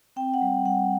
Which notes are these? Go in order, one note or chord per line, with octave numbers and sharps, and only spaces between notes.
C4 G5
F#5
G3
G3 F#5